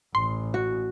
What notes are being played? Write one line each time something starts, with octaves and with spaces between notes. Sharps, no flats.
A1 C6
F#4